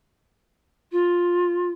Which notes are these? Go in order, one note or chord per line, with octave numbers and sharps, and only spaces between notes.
F4